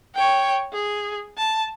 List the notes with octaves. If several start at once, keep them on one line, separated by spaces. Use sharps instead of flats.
C#5 G5
G#4
A5